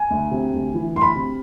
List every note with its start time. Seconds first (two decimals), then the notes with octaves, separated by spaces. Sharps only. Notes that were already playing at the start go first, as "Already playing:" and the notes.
Already playing: G#5
0.10 D2
0.31 C3
0.53 D2
0.74 E3
0.94 D2 C6
1.01 B5
1.15 C3